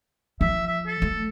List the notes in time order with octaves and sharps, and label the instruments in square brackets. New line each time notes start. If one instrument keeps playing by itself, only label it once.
[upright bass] F3 [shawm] E5
[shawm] E5
A4
[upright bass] A3